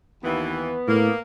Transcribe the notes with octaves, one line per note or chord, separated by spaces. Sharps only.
D#2 E3 B3
A2 A#3